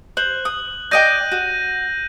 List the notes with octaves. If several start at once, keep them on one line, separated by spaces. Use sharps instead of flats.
C5 F#6 F#7
D#6
D5 D#5 G5 G6 A#6 D#7
F#4